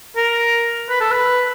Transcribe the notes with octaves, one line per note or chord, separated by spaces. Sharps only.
A#4
B4
A4
B4